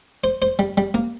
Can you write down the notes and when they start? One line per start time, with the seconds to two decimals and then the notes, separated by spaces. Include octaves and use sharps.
0.24 C5
0.42 C5
0.59 G3
0.77 G3
0.94 A#3